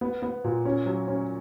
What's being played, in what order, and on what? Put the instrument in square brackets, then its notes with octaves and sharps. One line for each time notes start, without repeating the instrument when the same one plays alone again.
[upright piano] B3
B3
A#2
C#4
F#3
C#4